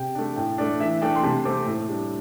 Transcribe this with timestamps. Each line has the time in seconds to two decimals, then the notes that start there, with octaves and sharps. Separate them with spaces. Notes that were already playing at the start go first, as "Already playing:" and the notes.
Already playing: C3 G5
0.15 A3 D4
0.36 A2 G5
0.58 A3 D4 D5
0.80 E3 E5
1.02 A3 D4 G5
1.16 C6
1.23 C3 A5
1.45 A3 C4 D6
1.67 A2
1.89 G3 D4